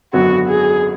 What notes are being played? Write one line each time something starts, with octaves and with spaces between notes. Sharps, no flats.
G#1 F#2 D3 F#3 B3 F#4
G#4